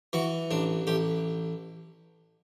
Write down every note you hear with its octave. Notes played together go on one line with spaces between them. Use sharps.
E3 F#4
A1 D4
A1 G4